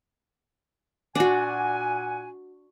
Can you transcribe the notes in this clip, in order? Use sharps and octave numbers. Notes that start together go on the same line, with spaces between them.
A#2 D4 F#4 F#5 G#5